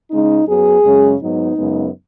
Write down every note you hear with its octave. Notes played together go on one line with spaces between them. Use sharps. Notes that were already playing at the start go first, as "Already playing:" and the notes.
C#3 G#3 C#4 D#4
F#2 F#3 B3 G#4
F#2 C#3 G#3 C#4
G#2 F#3 B3 D#4
F#2 C#3 G#3 B3